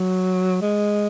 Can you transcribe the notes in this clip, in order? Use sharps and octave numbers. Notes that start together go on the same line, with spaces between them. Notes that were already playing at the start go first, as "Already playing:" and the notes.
Already playing: F#3
G#3